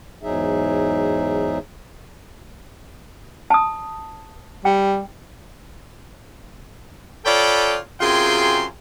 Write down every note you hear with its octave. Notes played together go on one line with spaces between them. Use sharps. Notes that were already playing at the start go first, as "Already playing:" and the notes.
E2 G#2 F#3 D#4 G#4 E5
A5 D#6
G3 G5
F4 A4 C#5 D5 G5 B5
F#2 C3 F4 G#4 G5 C6